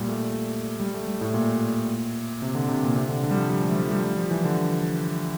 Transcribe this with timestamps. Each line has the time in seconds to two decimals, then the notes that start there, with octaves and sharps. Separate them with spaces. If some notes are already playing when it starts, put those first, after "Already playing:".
Already playing: A#2 G3
0.09 A3
0.80 G3
0.94 A3
1.07 G3
1.21 A2
1.34 A#2
2.42 C3
2.55 D3
2.68 C3
2.83 A#2
2.96 C3
3.09 D3
3.23 D3
3.31 G3
3.36 F3
3.50 G3
3.63 A3
3.72 G3
3.76 F3
3.91 G3
4.04 G3
4.18 F3
4.31 E3
4.45 D3